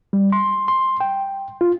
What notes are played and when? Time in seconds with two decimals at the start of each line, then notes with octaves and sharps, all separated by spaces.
0.13 G3
0.32 C6
0.68 C6
1.00 G5
1.61 F4